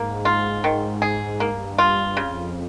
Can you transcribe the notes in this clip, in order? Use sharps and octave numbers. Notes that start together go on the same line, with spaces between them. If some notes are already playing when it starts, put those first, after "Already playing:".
Already playing: G#2 A#3
F4
D#3
G#4
G2 A#3
F4
F2 C#3